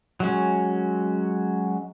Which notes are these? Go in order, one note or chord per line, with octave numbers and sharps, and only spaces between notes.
F#3 G#3 C#4